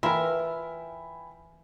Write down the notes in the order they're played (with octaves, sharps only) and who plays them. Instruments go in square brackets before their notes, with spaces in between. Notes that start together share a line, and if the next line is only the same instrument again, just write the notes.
[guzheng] E3 [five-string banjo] F4 A#4 [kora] E5 [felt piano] G5 G#5 B5